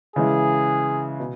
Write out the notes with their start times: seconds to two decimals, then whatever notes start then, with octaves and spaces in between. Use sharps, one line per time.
0.16 C#3 E3 G#3 E4 G#4
1.20 B2